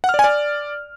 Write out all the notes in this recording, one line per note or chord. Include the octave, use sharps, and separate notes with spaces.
F#5
F6
D5
G#5
D5